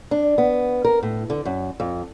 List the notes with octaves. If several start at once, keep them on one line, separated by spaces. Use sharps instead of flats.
D4
B3
A#4
A2
D3
F#2
F2